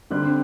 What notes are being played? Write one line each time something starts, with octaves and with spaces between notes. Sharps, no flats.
D3 G3 C4 F#6